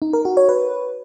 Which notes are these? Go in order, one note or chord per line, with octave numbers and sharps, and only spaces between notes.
D#4
A#4
F#4
C#5
B4